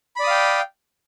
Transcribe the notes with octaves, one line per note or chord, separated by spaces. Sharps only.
D5 F5 G5 B5 D#6